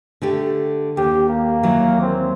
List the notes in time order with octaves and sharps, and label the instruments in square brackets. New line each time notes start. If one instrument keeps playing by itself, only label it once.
[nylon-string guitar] D3 A3 G4
[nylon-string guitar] D#2 [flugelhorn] G4
[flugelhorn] A#3
[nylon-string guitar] D#2 E3 F#3
[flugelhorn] C4